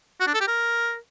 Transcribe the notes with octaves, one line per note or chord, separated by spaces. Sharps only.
F#4
D4
A4
G4
A#4